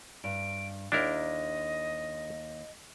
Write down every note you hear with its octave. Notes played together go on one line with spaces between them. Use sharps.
G2 D7
D#2 D4 E4 G4 A#4 D#5